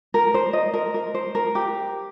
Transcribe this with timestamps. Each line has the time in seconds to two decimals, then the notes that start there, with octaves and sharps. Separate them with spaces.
0.14 A#4
0.34 C5
0.53 D#5
0.74 A#4
0.94 A#4
1.14 C5
1.35 A#4
1.55 G4